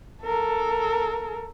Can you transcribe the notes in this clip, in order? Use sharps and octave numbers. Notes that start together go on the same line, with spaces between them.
A4 A#4